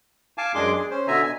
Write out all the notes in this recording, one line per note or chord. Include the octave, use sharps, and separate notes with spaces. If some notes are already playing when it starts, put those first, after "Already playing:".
F5 G#5 A5 D6
F#2 G#3 D4 G#4 C6 D6
G#4
C#4 C5
B2 D3 E5 G#5 A#5
G#5